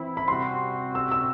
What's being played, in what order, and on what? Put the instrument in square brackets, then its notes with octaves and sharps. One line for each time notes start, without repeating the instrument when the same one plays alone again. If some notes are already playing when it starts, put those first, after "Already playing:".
Already playing: [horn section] E3 C4 E4 [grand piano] B5
[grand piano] B5
[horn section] C3 G3 C4 F#4 [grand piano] C6
[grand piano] E6
E6